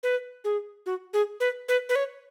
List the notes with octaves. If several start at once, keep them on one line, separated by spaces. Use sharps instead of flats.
B4
G#4
F#4
G#4
B4
B4
B4
C#5